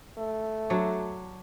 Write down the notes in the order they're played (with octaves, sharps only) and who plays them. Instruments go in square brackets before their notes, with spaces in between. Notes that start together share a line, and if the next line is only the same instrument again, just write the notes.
[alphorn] A3
[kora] F#3 D4 F#4